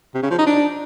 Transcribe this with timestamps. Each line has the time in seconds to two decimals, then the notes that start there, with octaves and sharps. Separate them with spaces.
0.15 C3
0.23 C#3
0.31 F3
0.39 D#4
0.47 D4